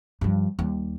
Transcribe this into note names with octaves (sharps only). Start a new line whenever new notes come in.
G2 F3
D#2 G3